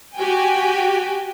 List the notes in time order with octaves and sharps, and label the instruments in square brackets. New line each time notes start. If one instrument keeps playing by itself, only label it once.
[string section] F#4 G4 G5 G#5